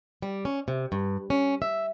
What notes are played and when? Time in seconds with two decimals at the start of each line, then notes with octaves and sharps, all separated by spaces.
0.22 G3
0.45 C#4
0.68 C3
0.92 G2
1.30 C#4
1.62 E5